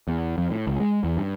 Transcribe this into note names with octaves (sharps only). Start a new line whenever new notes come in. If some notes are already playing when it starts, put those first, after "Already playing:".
E2
F2
A2
C#2
G#3
E2
G2